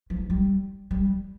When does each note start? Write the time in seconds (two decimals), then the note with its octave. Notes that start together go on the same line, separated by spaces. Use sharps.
0.10 F3
0.30 G3
0.91 G3